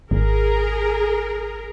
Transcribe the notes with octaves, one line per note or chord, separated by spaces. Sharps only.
G#1 G#4 A#4